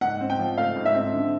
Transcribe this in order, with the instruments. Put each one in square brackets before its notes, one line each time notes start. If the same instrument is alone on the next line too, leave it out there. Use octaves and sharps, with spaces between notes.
[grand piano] G#2 [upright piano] F#5
[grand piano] C4
[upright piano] G5
[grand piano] F3
[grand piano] A3 [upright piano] F5
[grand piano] G#2
[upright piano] E5
[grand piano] C4
D3